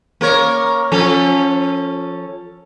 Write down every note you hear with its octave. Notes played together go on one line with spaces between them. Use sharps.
A#3 A#4 C#5
F3 C#4 A4